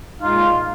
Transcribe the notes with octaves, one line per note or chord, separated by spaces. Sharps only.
A#2 G#3 D#4 F4